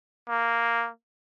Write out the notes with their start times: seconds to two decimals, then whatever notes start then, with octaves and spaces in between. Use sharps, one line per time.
0.29 A#3